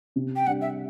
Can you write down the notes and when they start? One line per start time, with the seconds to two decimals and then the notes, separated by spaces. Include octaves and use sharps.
0.16 C3
0.36 G5
0.47 G3 D4 F#5
0.61 E5